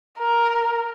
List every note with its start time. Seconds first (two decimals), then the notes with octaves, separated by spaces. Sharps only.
0.19 A#4